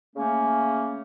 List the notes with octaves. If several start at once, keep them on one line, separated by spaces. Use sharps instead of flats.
C#3 A3 A#3 C#4